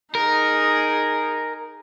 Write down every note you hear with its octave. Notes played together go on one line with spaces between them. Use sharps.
D#4 G#4 A#4